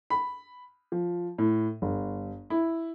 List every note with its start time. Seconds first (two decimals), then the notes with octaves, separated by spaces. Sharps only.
0.10 B5
0.92 F3
1.38 A2
1.82 G1
2.50 E4